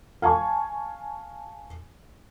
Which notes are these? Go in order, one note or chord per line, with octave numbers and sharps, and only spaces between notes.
F5 G#5 A5 C#6